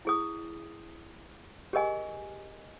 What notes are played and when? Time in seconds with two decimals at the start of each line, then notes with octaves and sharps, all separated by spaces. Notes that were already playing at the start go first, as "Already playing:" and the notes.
0.05 E4 G#4 D#6
1.73 G4 G#4 A#4 D#5 G#5